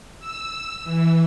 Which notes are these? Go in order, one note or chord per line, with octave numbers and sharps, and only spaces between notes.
E6
E3